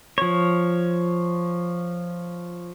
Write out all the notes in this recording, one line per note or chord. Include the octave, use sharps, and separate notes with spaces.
F3 C#5